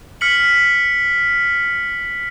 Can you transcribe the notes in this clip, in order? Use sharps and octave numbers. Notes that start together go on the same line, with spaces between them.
F6 B6 C#7 F#7